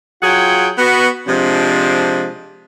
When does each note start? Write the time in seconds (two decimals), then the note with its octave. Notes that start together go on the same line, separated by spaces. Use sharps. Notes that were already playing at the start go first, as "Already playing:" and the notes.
0.22 F#3 F4 G#4 F#5 G5
0.77 B3 F#4
1.27 C3 F3 G#3 D4